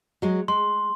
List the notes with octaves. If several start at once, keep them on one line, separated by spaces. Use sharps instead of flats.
F#3 G#3
G#3 C6